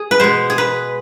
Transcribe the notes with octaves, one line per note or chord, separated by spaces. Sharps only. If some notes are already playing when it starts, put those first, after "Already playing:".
Already playing: G#4
B4
B2 G#3 C5
G#4
B4